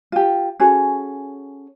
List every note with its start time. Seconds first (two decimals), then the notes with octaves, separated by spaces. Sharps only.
0.12 F4 G4
0.60 C#4 F#4 G#4 A4